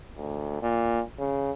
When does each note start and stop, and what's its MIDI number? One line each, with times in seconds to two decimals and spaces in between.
0.17 0.62 38
0.62 1.01 46
1.19 1.52 49